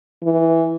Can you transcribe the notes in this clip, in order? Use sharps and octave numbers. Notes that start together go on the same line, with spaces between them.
E3